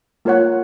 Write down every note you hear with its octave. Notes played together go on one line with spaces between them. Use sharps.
A#3 F4 A#4 C#5 F#5